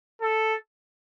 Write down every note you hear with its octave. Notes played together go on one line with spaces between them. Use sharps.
A4